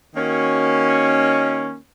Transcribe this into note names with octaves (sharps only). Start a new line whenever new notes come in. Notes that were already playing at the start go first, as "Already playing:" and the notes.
D#3 A#3 C#4 F#4